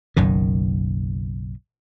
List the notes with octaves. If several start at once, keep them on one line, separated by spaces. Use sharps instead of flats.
F#1 B1 F#2 D#3